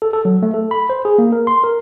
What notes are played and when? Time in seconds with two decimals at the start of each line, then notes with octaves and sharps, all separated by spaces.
0.02 A4
0.13 A4
0.25 F#3
0.43 A3
0.54 A4
0.71 B5
0.90 C5
1.05 G#4
1.18 A#3
1.32 A#4
1.47 C6
1.64 A#4